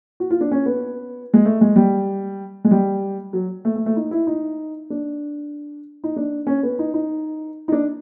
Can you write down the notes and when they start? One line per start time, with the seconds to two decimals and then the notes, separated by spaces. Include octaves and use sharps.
0.20 F#4
0.30 F4
0.41 D4
0.51 C#4
0.66 B3
1.34 G#3
1.45 A3
1.61 G#3
1.76 G3
2.64 G#3
2.71 G3
3.33 F#3
3.65 A3
3.76 A3
3.86 A3
3.96 D#4
4.11 E4
4.27 D#4
4.90 D4
6.04 D#4
6.16 D4
6.47 C#4
6.63 B3
6.79 D#4
6.94 D#4
7.68 D#4
7.72 D4